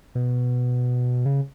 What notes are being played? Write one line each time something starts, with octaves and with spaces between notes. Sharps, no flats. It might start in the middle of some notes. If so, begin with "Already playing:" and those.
B2
C#3